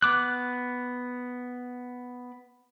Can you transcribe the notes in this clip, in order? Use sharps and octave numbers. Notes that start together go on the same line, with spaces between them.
B3 D6 F#6